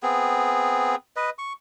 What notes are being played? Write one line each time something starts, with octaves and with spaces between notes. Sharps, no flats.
B3 C4 G#4
B4 D#5
C#6